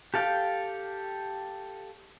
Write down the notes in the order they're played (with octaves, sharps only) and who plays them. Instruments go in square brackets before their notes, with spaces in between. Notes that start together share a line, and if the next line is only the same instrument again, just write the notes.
[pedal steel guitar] G4 A4 F5 G5